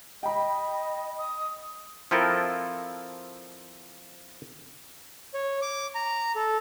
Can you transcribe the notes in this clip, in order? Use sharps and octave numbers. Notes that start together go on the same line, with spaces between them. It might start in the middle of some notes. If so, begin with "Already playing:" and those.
D#5 G5 B5
D#6
F3 C4 E4 F4 A4 A#4
C#5
D6
A#5
A4